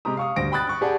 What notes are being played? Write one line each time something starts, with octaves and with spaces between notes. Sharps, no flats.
C3 G#3 G4 A#5 D#6
F5 C#6 D#6
D2 G2 C5 A#6 D7
G5 B5 D#6 F#6 A6
C#6 F#6
G4 G#4 D5 F#5 A5